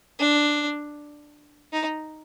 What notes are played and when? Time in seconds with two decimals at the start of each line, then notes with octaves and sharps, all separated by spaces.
0.19 D4
1.73 D#4